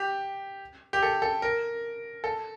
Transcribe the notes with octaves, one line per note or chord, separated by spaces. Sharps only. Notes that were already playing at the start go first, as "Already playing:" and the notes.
Already playing: G4
G4
A4
A4
A#4
A4